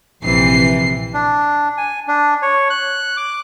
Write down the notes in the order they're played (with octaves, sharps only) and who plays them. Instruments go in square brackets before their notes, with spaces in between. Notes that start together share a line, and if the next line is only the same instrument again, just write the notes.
[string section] A#1 C3 E3 C7
[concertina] D4
G#5
D4
C#5
F#6
D6